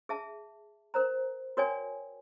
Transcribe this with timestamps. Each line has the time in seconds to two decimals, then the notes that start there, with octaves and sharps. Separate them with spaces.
0.09 G#4 E5 A5
0.94 A#4 C5 A#5
1.57 F#4 A#4 C#5 D5 G5 G#5